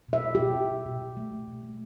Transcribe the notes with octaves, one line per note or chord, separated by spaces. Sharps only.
B2 E5
B2
B2 G4
B2
B2
B2
B2
A3
B2
B2
A3